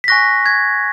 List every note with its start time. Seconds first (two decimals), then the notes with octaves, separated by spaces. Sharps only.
0.04 B6
0.08 G#5 C#6 F#6 A#6
0.46 G#6